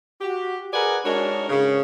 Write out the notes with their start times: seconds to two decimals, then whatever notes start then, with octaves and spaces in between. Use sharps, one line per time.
0.21 F#4 G4
0.73 G#4 A#4 B4 D5 F#5 G#5
1.04 G#3 D4 D#4 F#4 A#4 C#5
1.49 G#2 C#3